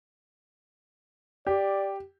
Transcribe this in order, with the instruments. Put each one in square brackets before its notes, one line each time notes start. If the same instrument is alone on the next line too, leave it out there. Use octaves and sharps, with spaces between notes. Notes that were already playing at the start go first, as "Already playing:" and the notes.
[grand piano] G4 [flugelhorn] D5